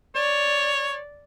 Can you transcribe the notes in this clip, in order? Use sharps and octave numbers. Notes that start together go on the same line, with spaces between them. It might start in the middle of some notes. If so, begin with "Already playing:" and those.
C#5 D5